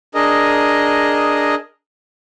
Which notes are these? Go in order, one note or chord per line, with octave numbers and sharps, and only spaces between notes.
D4 G#4 A#4 D#5